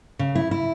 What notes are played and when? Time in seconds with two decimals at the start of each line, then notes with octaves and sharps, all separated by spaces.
0.19 C#3
0.35 E4
0.51 E4